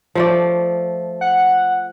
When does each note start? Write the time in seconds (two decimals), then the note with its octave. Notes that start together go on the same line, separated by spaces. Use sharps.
0.15 F3 A3 D5
1.21 F#5